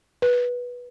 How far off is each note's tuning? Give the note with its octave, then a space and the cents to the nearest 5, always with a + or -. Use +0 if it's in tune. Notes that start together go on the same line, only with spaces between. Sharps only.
B4 -15